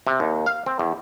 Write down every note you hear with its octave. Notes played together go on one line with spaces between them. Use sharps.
C3
D#2
F5
C4
E2